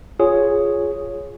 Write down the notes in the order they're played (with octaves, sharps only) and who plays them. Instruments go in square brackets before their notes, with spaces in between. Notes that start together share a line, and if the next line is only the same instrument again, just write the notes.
[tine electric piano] F4 G#4 C#5